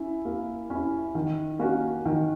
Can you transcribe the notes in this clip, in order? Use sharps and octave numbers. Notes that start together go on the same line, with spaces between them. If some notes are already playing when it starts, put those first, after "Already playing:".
Already playing: C#4 E4
A#3
C#4 E4
D#3
A#3 C#4 F#4
D#3